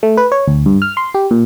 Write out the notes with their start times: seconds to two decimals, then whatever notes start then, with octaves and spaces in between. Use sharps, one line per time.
0.03 A3
0.17 B4
0.32 C#5
0.48 D2
0.66 G2
0.82 F6
0.97 C6
1.14 G4
1.31 A#2